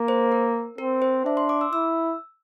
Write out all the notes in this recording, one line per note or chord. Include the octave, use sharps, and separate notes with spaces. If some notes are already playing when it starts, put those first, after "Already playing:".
Already playing: A#3
C5
A#4
C4 A#4
C5
D4 E5
C6
D6
E6
E4 E6